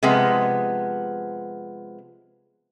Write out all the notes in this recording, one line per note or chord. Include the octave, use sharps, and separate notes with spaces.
C3 F3 G#3 B3